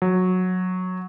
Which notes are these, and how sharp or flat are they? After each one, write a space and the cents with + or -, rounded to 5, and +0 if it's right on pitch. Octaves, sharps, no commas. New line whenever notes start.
F#3 -10